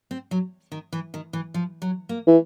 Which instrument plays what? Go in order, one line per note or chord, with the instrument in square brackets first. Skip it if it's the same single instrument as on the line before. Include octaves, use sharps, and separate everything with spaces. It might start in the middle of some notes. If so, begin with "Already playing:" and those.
[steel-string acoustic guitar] C4
F#3
D#3
E3
D#3
E3
F3
F#3
A#3
[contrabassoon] E3